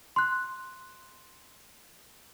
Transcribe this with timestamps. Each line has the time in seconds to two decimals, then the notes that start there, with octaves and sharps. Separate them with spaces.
0.16 C6 F#6